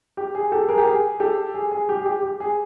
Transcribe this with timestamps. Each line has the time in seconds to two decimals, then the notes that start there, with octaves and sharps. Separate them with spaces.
0.17 G4
0.35 G#4
0.52 G4 A4
0.69 G#4 A#4
0.78 G4
0.86 G#4
1.20 G4 A4
1.54 G#4
1.71 G#4
1.89 G4
2.01 G#4
2.06 G4
2.23 G4
2.40 G#4